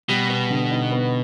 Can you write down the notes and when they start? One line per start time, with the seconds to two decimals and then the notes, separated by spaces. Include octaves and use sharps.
0.09 B2 G3
0.29 B3
0.50 D3
0.71 D#4
0.92 B3